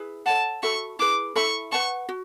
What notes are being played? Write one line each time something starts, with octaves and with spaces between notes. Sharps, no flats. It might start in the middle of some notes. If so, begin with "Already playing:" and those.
Already playing: E4 G#4 B4
A4 C#5 F#5 A5
F#4 A4 E5 B5 C#6
E4 G#4 B4 D6
E4 A4 E5 B5 C#6
B4 F#5 A5 C#6
F#4